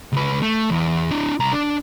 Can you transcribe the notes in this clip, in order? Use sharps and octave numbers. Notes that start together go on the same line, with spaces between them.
C#2 B4
A3
E2
D4 E4
C2 A#5
D4